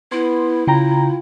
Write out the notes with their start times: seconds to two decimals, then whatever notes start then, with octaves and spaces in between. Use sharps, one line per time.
0.12 B3 E4 C6
0.67 C#3 F4 G5 A#5